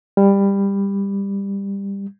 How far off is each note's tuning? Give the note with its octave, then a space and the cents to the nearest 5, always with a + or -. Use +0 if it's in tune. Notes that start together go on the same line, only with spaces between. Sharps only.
G3 +15